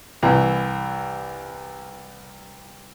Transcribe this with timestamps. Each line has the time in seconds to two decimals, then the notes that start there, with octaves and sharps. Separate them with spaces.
0.23 C2 E3